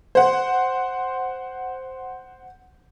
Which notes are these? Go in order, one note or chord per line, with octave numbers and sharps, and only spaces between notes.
C5 F#5